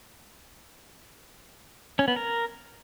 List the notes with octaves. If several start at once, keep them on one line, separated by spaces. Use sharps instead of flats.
C#4
B3
A#4